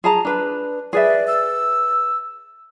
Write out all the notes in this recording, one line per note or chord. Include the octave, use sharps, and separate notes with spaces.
G#4 A5 A#5
D4 B4 A5
G#4 B4 D5 E5
E6